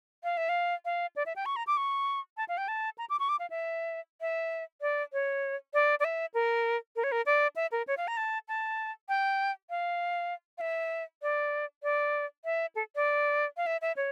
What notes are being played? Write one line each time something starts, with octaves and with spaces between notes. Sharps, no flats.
F5
E5
F5
F5
D5
E5
G5
C#6
A#5
D6
C#6
A5
F5
G5
A5
A#5
D6
C#6
D6
F5
E5
E5
D5
C#5
D5
D5
E5
A#4
A#4
C#5
A#4
D5
E5
A#4
C#5
F5
A#5
A5
A5
G5
F5
F5
E5
D5
D5
E5
A4
D5
F5
E5
E5
C#5